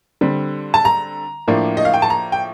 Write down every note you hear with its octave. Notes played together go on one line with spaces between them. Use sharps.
D3 G3 C4
A5
A#5
A2 F3 A#3 D4
D#5
F5
G5
A5
A#5
G5